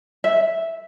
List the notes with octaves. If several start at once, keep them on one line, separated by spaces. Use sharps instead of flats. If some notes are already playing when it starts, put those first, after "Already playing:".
E5